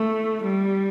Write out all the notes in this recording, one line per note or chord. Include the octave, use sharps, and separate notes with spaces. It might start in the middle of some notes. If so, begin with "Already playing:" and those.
Already playing: A3
G3